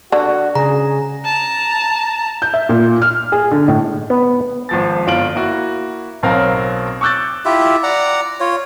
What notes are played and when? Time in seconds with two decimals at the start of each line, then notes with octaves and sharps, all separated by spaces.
0.12 D3 F#4
0.55 C#3 G#4 A#5
1.25 A5 A#5
2.42 G6
2.54 E5
2.69 A#2
3.02 F6
3.32 G#4
3.51 D3
3.68 A2
4.10 B3
4.69 G#1 F3 A6
5.07 G1 F4 D7 F#7
5.35 A#3 E4 F#4
6.23 B1 B2 F#3 C4 A#4 F5
7.01 C#6 D6 E6 F#6 G6 A6
7.45 E4 F4 G4 E5
7.83 D5 F#5 A#5
8.40 F4 C#5